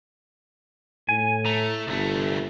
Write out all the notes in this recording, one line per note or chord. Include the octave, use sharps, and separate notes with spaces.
A2 G#5
A3 A#5
G1 C2 A3